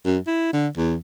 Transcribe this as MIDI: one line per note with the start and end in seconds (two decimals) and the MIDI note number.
0.05 0.19 42
0.27 0.51 64
0.53 0.68 50
0.77 0.95 40